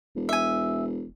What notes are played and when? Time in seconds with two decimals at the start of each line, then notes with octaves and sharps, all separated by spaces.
0.16 E1
0.29 E5 G#5